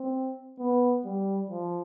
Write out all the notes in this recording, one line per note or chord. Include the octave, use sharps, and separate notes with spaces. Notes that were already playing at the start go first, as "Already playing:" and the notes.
Already playing: C4
B3
G3
F3